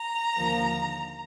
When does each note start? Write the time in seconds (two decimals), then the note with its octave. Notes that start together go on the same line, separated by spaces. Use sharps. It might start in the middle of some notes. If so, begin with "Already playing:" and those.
Already playing: A#5
0.37 D#2 D3 F3 A#3